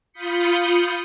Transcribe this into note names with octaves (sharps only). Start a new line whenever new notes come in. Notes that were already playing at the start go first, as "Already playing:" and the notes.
F4 B5 D#6 G6 B6 C#7